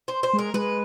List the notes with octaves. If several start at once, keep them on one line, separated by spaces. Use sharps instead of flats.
C5
C5
G#3
A#4
G#3 B4